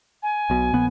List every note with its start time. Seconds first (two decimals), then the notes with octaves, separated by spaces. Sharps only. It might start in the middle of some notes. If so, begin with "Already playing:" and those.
0.23 G#5
0.50 B1 B2
0.73 A#1 B3